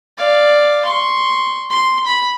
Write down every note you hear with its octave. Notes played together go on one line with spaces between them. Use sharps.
D5 F5
C6 C#6
C6
B5